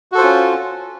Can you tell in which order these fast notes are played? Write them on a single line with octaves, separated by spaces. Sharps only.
F#4 A4 C5 F4 C#4